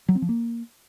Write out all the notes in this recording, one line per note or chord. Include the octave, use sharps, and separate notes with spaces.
F#3
C4
F3
A#3